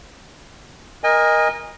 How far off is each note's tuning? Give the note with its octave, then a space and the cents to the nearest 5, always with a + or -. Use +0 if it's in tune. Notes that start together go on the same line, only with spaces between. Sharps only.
A#4 +15 D#5 +0 G#5 -30